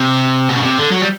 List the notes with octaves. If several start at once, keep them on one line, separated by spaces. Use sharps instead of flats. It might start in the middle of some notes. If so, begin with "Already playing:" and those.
Already playing: C3
B2
C#3
C3
D3
F#3
G3